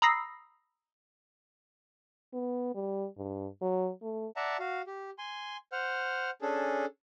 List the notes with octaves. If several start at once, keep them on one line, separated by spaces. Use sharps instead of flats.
A#5 B5 D#6 E6 A#6 C7
B3
G3
G2
F#3
A3
D5 E5 F#5 A5 A#5
F#4 F5
G4
G#5 C6
C5 F#5 F6
C#4 D4 G#4 A4